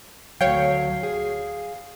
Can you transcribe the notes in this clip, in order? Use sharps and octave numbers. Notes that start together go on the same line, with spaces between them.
D2 F#3 C#5 F5 G5
G#4